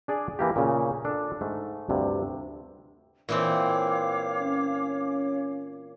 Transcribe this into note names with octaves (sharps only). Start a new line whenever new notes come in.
D4 G#4 D5 G#5
E3 A#3 G4
A#2 C#3
D4 A4
G#2 A3
D2 G2 C3
A#2 E3 C4 C#5 F5 D6
C#4